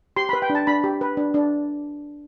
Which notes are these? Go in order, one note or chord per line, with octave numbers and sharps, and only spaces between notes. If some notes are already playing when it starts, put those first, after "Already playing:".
G4 C6
B4 B5
G5
D4
A5
D4 B5
G4
B4
D4
D4